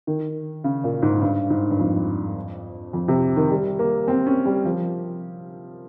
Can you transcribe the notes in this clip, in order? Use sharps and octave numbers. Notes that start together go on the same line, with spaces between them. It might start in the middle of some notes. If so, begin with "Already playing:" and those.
D#3
C#3
A#2
G#2
G2
G#2
G2
F2
F2
C3
D#3
G3
A#3
C4
C#4
G3
F3